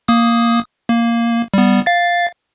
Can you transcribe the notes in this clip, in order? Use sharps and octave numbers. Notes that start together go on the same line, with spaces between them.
A#3 D#6
A#3
G3 B3
F5 A6